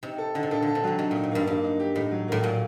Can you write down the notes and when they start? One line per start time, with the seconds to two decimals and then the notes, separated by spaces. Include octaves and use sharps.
0.03 C3 D#4
0.18 A4
0.35 D3 D#4
0.43 C3
0.51 A#2 A4
0.62 D3 A4
0.75 C3
0.84 D3 F#3
0.99 C3 D#4
1.11 A#2 D#4
1.23 A2
1.31 G2 A#3
1.47 G2 A#3
1.64 D#4
1.80 G4
1.95 A2 D#4
2.11 F#3
2.28 A2 A#3
2.44 A#2 F#3